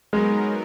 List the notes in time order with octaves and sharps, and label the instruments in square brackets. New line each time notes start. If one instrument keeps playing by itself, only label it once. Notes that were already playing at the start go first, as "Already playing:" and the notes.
[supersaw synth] F#3 B3 D#4 A#4 [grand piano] G#3